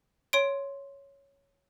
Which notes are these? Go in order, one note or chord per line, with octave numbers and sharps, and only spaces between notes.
C#5 C6 D7